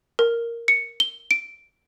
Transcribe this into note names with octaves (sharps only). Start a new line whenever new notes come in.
A#4
C#7
G7
D7